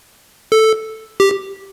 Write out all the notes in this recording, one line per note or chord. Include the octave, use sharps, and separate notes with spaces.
A4
G4